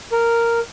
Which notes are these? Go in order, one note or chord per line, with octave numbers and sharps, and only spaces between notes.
A#4